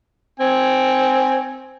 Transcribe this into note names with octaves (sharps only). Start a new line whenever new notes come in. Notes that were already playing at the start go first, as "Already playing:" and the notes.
C4 G#5